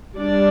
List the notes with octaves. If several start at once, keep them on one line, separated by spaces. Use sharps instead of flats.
G3 D4 D5